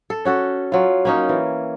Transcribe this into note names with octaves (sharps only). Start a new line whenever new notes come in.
A4
C#4 F#4 A4
F#3 F4
A#3 C#4 D#4
E3